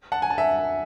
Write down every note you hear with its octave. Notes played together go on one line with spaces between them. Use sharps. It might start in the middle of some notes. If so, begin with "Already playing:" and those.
F#5 A5
G#5
A5
E5 G#5